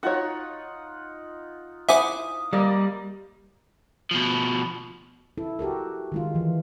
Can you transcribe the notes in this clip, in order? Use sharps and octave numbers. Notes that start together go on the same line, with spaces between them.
D#4 F4 F#4 C#5 F#5
E4 C5 E5 F#5 G#5 D6 D#6
G3 A#3 D5 D#5
B2 F3
E4 A4
F#4 G4 A4 A#4
D#3 G#3 F4
E3 F3